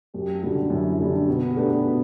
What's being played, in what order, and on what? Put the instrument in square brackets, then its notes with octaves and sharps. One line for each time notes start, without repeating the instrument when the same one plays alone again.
[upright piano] F#2 [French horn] G4
[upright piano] D3 G3 [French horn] F#4
[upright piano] F#2 [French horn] E4
[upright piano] D3 G3 [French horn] D4
[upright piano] B2 [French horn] B3
[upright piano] A3 D4 G4 B4
B2